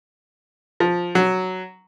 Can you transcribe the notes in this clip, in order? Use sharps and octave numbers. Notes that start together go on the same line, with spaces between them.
F3
F#3